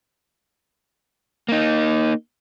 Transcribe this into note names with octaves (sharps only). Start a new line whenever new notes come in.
A#3 D#4